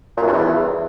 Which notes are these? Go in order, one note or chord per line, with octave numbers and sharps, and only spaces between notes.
A#2
F#2
G2
E2